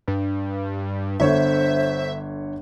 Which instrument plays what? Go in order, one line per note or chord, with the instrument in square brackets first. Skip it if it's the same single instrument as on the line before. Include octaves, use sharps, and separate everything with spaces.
[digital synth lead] G2
[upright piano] G1 D3 C#5 [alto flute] C5 [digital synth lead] E5